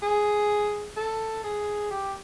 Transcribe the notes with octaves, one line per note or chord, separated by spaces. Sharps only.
G#4
A4
G#4
G4